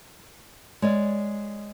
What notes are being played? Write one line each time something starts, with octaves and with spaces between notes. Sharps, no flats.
G#3 C#5 D5